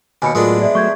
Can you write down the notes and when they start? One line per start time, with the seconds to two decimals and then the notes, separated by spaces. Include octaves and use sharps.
0.22 D#2 B2 G#5 B5 C#7
0.35 A2 F#3 G#3 B3 D4 F4 A#4 D#6
0.62 D5 E5
0.75 F#3 A3 C#6 G6 G#6